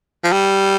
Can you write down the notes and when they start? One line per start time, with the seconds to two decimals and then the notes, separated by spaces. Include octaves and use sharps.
0.24 F3
0.32 G3